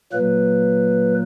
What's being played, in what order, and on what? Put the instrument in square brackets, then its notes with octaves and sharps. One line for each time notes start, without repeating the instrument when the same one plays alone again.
[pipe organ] A#2 F#3 A#3 B4